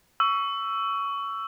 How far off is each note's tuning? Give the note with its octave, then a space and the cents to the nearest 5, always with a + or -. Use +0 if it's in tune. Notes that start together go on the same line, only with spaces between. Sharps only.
C#6 +20 E6 +10